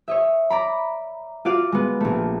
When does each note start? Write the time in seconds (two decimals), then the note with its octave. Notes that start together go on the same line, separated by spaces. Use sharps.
0.08 C#5 D#5 E5
0.50 D5 A#5 B5
1.45 F4 F#4 D5 F5
1.72 G#3 B3
2.00 A#1 A3